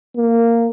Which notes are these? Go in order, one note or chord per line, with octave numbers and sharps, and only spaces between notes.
A#3